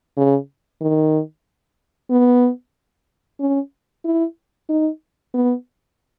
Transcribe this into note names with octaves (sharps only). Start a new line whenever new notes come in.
C#3
D#3
B3
C#4
E4
D#4
B3